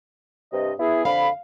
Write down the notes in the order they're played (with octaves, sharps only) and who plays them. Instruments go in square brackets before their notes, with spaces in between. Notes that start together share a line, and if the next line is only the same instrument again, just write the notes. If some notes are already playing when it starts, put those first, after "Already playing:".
[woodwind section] G2 C3 D#5
B3 E4 G#4
[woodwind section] F2 D3 B5 [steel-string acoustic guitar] F5